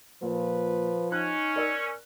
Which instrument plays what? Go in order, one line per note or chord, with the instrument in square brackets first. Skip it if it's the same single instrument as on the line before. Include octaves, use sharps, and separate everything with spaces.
[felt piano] A#2 [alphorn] F3 [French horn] B4
[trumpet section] C#4 [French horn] D#4 [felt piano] F#6
[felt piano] A#4 D5 E6